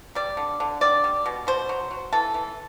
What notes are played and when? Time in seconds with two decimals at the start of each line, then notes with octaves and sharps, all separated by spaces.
0.15 G3 D5
0.37 D3
0.60 D3
0.81 G3 D5
1.04 G3
1.26 B2
1.47 B2 C5
1.69 F#3
1.91 F#3
2.13 E3 A4
2.34 E3